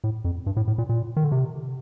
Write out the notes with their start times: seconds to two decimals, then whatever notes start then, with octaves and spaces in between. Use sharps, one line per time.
0.04 A2
0.25 F2
0.46 G2
0.57 A2
0.68 A2
0.78 A#2
0.89 A#2
1.17 D#3
1.24 D3
1.32 C3